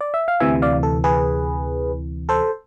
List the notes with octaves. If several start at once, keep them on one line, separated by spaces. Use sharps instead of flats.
D5
E5
F5
D2 C3 E3 E5 G#5
D5 F5
A4
G#4 B4
A4 C5